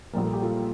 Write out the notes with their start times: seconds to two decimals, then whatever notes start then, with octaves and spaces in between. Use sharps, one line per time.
0.13 A#1 A#2 G3 A#3 A#4
0.24 A4
0.33 G4
0.42 F4 A4